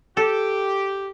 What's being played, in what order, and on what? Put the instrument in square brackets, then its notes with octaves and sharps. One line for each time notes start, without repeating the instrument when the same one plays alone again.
[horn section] G4 [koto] A4